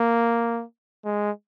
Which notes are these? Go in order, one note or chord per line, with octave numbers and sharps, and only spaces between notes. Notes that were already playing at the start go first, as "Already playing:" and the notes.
Already playing: A#3
G#3